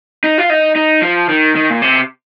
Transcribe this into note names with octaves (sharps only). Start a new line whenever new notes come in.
D#4
F4
D#4
D#4
F3
D#3
D#3
A#2
C3